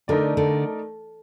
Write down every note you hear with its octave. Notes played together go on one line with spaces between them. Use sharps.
D3 A3 D#4 A#4 D5
D3